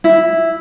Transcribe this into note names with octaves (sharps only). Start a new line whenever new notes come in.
E4